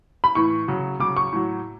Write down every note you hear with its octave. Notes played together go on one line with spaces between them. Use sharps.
B5
A2 E3 C#6
C#3 F#3
C#3 F#3 D6
C#6
A2 F#3